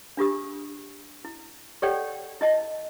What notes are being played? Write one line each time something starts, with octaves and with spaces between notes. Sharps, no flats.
D4 F4 G4 D#6
E4
G4 A4 C#5 D5 F#5 G5
E4 D#5 A5